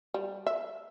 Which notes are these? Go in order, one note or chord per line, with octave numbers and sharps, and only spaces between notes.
G3
E5